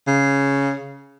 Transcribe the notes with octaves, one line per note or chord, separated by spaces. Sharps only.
C#3